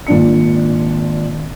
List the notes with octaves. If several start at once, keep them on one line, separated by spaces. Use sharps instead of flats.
G#1 A#2 D4 C#7